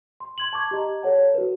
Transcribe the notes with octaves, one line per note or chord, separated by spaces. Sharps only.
C6
C6 G#6 F#7
A5 C#6 D6 G#6
G4 D#5 A#5
A4 C#5 F#5 A5
F#4 A#4 B4